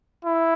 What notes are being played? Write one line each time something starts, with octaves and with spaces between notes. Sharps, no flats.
E4